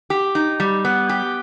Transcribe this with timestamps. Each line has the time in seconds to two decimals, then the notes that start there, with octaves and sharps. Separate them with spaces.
0.10 G4
0.35 D#4
0.60 G3
0.85 B3
1.09 G4